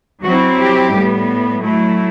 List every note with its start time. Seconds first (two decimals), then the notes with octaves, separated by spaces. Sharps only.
0.23 F#3 C4 E4 F#4
0.57 G4
0.92 A2 G3 B3
1.60 F#3 A3 E4